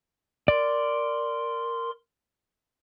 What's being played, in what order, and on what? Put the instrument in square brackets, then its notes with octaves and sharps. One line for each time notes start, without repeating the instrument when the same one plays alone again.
[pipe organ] A#4 C6 [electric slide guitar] D5